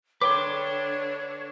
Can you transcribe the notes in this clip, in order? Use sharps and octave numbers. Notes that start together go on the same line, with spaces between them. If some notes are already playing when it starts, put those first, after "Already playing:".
D3 D4 B4 C#5 G5 C6 D6